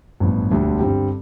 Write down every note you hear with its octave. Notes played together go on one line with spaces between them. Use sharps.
A1 G2 F3 B3
E1 D2 D3 G3
G2 D3 G3 C4 G4